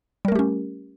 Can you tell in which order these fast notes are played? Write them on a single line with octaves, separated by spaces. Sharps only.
G3 A#4 A3 G4 C#4